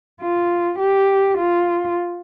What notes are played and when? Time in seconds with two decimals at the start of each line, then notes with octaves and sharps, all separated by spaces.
0.22 F4
0.79 G4
1.38 F4